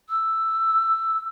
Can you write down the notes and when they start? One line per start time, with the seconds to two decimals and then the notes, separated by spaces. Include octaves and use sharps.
0.09 E6